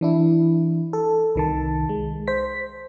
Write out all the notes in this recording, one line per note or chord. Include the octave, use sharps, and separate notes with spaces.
E3 D4 E4
A4
C2 D#3 A5
G#3
C5 B6